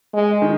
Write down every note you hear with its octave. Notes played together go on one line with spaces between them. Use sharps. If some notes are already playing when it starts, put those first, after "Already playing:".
G#3
D#3